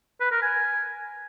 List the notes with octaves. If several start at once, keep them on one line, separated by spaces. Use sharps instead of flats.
B4
A#4
G#5